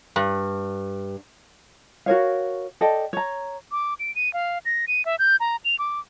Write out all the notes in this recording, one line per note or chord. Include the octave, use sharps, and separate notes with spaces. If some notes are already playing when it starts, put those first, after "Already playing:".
G2
F#4 A#4 C#5 F5
A4 D5 D#5 G5
C#5 A#5
D6
D7
D#7
F5
A#6
D#7
E5
G6
A#5
F7
D6